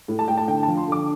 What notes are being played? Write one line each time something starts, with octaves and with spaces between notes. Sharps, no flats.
A2
A5
A2 G5
A5
D3 G5
A5
F3
C6
D3 D6